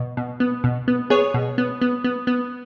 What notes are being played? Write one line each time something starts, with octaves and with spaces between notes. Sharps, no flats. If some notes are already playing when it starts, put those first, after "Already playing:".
Already playing: B2
B2
B3
B2
B3
B3 G#4 C#5
B2
B3
B3
B3
B3